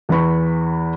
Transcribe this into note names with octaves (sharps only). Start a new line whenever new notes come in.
E2 E3 B4 B5 C#6